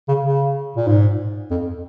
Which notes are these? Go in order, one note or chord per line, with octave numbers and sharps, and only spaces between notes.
C#3
C#3
A#2
G#2
F2